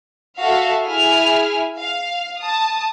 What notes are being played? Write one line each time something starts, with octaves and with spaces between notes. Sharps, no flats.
F#4 A4 E5 F5
E4 G#4 G#5 F6
F5
A5 D#6